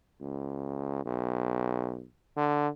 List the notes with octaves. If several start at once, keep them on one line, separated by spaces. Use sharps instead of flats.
C#2
B1
D3